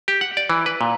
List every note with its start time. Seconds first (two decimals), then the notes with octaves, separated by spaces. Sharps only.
0.08 G4
0.21 F#5
0.37 D5
0.50 E3
0.66 B4
0.81 A#2